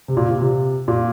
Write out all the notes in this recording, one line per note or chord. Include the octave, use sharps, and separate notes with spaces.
C3
A#2
C3
C3
A#2